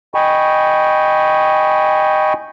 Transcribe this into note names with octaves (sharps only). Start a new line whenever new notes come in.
D#5 G5 G#5 B5 C#6